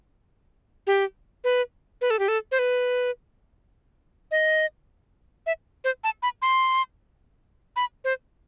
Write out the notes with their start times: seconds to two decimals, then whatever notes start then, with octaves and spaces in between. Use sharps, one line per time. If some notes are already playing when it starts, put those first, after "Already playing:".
0.87 G4
1.44 B4
2.01 B4
2.10 A4
2.19 G4
2.28 A4
2.52 C5
2.59 B4
4.31 D#5
5.46 E5
5.84 C5
6.04 A5
6.23 B5
6.42 C6
7.76 B5
8.05 C5